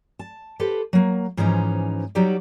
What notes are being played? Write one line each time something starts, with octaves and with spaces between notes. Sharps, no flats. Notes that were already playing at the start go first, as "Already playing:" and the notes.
A5
G4 A4 B4 C5
F#3 A#3
G#2 E3 F3 C#4 D#4 A#5
F#3 G3 D#4 F#4 G4 D5